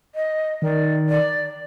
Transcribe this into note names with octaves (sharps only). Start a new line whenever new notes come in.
D#5
D#3 D5
D5